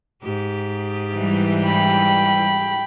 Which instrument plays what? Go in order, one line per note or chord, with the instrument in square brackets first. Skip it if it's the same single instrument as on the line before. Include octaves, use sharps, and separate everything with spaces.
[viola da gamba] G#2 G4
[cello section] E3 G3
[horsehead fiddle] G5 B5